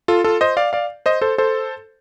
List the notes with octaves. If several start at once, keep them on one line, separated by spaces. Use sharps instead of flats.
F4 A4
F4 A4
C5 D#5
D5 F5
D5 F5
C5 D#5
A4 C5
A4 C5